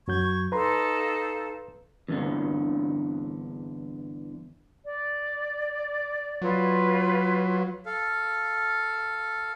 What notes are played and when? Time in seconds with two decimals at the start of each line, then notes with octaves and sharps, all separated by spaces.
0.08 F#2 F#3 C#6 G6 G#6
0.52 D#4 A4 B4 F5 A#5 C6
2.08 E2 G2 D3
4.85 D5
6.42 F#3 F4 B4 C#5
7.86 A4 F5